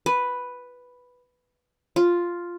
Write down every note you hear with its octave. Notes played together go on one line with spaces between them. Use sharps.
B4
F4